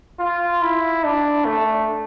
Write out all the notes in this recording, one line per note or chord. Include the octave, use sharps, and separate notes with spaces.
F4
E4
D4
A3